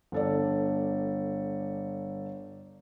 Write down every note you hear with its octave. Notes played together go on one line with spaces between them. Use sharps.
G1 A4 D5